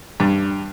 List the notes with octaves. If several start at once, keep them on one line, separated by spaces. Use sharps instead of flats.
G2